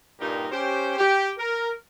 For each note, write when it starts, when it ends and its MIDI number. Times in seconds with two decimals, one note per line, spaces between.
0.19 0.46 43
0.19 0.46 46
0.19 0.46 55
0.19 0.46 63
0.19 0.46 67
0.19 0.46 70
0.51 0.97 61
0.51 0.97 67
0.51 0.97 72
0.98 1.31 67
1.37 1.71 70